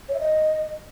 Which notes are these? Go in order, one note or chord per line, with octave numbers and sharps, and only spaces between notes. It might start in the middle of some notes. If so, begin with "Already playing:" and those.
C#5
E5
D#5